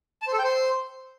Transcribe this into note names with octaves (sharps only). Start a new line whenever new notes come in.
A5
C5
A4
G5
C5